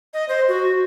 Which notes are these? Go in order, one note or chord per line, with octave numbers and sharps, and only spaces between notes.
D#5
C5
F#4